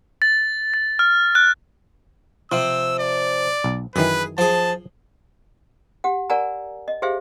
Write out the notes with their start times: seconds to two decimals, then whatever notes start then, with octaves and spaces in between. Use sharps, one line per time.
0.22 A6
0.74 A6
0.99 F6
1.35 F#6
2.52 C3 F3 F4 E6
3.00 D5
3.64 B1
3.96 F#2 D#3 E3 G#4 B4
4.38 F3 G#4 A5
6.04 G4 F#5
6.30 A#4 D5 F#5 G#5 A#5
6.88 D#5
7.02 G4 G#4 C5 E5 F5